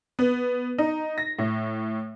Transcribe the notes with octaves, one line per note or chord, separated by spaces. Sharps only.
B3
D#4
A#6
A2